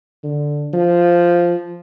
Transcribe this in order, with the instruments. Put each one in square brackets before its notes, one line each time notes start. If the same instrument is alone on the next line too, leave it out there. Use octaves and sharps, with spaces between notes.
[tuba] D3
F3